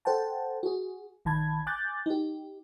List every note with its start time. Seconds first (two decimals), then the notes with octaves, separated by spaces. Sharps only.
0.05 A4 C5 F#5 G5 A5
0.63 F#4 G#4
1.25 A#1 D#3 A5 B5 G#6
1.67 G#5 D6 F#6 G6 A6
2.06 D#4 G4